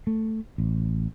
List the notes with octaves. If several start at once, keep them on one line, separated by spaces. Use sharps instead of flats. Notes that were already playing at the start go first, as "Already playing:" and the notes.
A3
A1